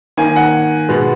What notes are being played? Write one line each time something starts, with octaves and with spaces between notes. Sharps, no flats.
D#3 A#3 G#5
F#5
B2 G#3 B3